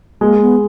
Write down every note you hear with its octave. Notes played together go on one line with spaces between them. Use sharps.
G#3 A#3
B3